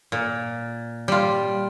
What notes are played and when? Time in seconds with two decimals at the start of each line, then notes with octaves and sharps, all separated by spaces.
0.12 A#2
1.08 G3 F4